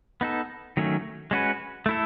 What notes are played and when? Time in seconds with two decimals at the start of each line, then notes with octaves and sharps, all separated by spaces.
0.21 B3 D#4 A4
0.77 D#3 F#3 A3 C#4
1.31 G#3 C#4 F#4 B4
1.86 A3 E4 A4